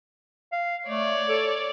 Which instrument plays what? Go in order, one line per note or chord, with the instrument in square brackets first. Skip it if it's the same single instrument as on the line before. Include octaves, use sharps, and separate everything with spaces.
[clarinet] F5
[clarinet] A3 [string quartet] C#5 D5
[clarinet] A4